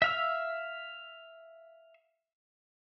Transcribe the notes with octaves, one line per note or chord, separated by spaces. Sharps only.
E5 F5 E6